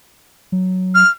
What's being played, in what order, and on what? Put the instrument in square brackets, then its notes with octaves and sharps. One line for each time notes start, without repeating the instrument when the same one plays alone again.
[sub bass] F#3
[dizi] F6